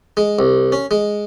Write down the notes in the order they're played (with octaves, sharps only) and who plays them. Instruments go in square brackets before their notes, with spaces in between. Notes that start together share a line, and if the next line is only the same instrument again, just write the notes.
[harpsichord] G#3
C2
C#4
G#3